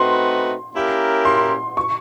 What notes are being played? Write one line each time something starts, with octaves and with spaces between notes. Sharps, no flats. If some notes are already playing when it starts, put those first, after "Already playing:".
Already playing: A3 C4 D#4 F#4 B4 C6
A#3 C#4 E4 G4 A#4
C6
C#6